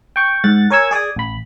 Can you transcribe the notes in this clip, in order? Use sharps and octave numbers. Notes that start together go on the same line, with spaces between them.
G5 C#6
G#2 F#5 A6
A#4 C#5 G#5 C#6 E6 G#6
G#4 D5 G#5 D#6
A1 B5